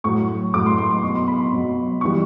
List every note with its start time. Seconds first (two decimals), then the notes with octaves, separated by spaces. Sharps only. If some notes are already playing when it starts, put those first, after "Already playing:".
0.04 A2 F#3 C#6
0.54 A2 F#3 D6
0.66 C6
0.78 C6
0.91 C6
1.03 B2 F#3 C#6
1.15 C6
1.28 B5
1.40 C6
1.52 B2 F#3
2.01 E3 G3 C#6